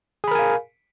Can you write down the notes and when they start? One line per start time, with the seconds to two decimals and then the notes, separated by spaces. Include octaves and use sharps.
0.24 G#4
0.28 B5
0.31 A#4
0.35 G#5
0.39 F5